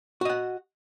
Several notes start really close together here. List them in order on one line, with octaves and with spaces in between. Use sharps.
F#4 D#5 F#5